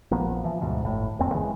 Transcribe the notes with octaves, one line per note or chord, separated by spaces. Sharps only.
A#1 F3 A#3 B3
E3 F3
D2 G#2 B2
G1 A2
D#1 F2 A#2 C4
C#3 E3 F#3 G#3